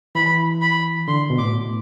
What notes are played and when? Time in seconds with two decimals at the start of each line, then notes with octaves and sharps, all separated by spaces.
0.15 E3 B5
0.62 B5
1.08 D3 C6
1.30 B2
1.38 A2 D6